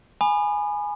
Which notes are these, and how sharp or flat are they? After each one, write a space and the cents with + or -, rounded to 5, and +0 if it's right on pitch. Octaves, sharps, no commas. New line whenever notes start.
G#5 +0 B5 +0 D#6 -45